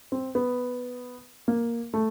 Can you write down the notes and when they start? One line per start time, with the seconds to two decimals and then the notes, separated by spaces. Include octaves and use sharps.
0.12 C4
0.35 B3
1.48 A#3
1.94 A3